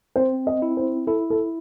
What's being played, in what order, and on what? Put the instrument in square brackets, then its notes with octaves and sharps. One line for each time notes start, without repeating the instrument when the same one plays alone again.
[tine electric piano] C4 [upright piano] C5
[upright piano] D#5
[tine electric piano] E4
[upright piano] C5
[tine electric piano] E4 [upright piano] A4
[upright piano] A4